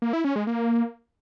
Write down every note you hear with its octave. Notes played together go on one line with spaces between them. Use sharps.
A#3
E4
C#4
G#3
A#3